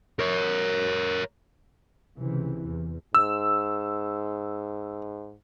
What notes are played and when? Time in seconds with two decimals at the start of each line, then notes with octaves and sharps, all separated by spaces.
0.19 A#4 C#5
2.17 C#2 C3 E3
2.66 E2
3.15 G#2 E6